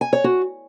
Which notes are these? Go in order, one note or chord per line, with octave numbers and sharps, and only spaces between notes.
G#5
C#5
F#4